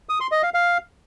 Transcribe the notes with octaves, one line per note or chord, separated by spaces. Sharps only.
D#6
C6
D#5
F5
F5